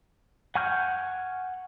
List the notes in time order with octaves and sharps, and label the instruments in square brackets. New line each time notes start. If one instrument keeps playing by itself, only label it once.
[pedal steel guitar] F#5 G#5 C#6 F6 G6